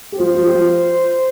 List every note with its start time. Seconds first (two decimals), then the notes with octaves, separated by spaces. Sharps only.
0.12 G4
0.19 F3 F4 C5
0.36 F3 F4
0.46 G4
0.54 F3 F4